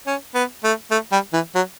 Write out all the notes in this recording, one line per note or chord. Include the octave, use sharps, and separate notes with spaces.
C#4
B3
A3
A3
G3
E3
F#3